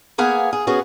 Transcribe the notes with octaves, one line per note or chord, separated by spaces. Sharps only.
A#3 B3 G#4 F5 F#5 G#5
G#4
B3 C#4 F#4 G#4